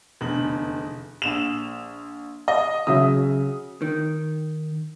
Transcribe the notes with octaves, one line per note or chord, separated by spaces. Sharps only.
F1 E2 D3 F#7
A#1 E7 F7
D#5
C#3 F#3 E5 D#6
D#3